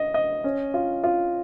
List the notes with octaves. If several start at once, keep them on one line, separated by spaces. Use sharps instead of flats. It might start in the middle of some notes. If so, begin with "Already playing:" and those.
Already playing: D#5
D#5
C#4
F4
F4